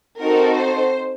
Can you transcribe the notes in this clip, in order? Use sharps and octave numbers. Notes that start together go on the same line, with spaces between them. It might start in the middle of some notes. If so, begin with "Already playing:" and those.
C4 D#4 F#4 A4 A#4
C5